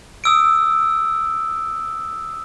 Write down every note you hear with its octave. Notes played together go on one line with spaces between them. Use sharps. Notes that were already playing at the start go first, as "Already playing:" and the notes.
D#6 E6 D7